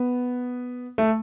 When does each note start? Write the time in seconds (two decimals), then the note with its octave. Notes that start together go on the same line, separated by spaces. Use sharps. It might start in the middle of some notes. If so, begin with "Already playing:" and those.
Already playing: B3
0.98 A3